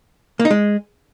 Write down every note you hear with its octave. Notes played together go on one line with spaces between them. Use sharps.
A#3
D#4
G#3